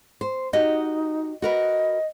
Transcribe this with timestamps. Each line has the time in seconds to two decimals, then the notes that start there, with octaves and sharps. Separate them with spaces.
0.21 C5
0.53 D#4 F#4 G4 D#5
1.42 F#4 A#4 B4 D#5